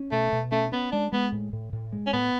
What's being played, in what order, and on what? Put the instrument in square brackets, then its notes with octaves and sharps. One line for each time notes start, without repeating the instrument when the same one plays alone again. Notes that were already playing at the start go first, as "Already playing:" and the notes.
Already playing: [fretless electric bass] C#4
[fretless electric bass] B2 [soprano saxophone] A3
[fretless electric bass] B2
[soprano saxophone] A3 [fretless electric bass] C#4
[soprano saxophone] B3 [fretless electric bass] C#4
[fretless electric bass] G#3 [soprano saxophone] D4
[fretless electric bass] G#3 [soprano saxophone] B3
[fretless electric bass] A2
A2
A2
G#3
[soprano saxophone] C#4
[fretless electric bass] A2 [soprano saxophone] B3